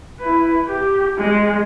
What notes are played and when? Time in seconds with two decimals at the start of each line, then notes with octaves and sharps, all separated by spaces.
0.20 E4 B4
0.68 G4
1.18 G#3